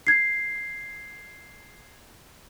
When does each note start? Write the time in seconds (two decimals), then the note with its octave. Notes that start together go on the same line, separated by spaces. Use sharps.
0.07 G#6 C7